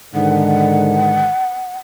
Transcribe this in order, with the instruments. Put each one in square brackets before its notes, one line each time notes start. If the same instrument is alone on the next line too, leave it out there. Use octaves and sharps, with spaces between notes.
[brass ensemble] G#2 D3 D#3 [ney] F#5